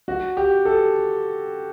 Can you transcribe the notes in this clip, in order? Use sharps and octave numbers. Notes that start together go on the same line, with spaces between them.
F#4
G4
A4